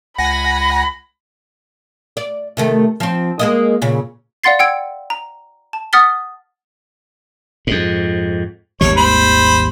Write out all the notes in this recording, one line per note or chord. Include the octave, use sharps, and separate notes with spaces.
C#2 F#5 G#5 B5 A#6
D5
C3 D#3 A3
F3 C4
G#3 A#3 D#5
A#2 C#3
D5 F5 F#5 C6 A6 C7
F#5 G5 E6 G#6 C#7 D7
A#5
A5
F#5 D#6 F6 A6 B6 G7
F2 G#2
G#1 D#2 G3 C#5
C5 B5